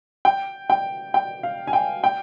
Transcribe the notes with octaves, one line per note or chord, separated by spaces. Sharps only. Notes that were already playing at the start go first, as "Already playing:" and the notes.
G5
G5
G5
F5
G#5
G5
G5